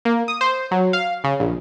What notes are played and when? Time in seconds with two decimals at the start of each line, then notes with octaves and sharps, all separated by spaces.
0.05 A#3
0.28 D#6
0.41 C5
0.71 F#3
0.93 F5
1.24 C#3
1.40 A#1